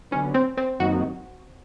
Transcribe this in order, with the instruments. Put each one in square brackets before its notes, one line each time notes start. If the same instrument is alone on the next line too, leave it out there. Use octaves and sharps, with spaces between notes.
[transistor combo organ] D3 F#3 B3 [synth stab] C#4
[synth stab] C4
C4
[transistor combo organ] F#2 D#3 F#3 A#3 D#4 [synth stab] F#4